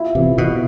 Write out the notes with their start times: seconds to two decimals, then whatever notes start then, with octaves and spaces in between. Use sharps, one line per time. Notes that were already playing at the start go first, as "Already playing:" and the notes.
Already playing: E4 F4
0.15 C3 E3
0.37 B2 E3